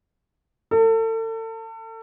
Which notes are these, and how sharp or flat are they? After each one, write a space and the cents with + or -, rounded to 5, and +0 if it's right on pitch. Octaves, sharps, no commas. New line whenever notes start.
A4 +35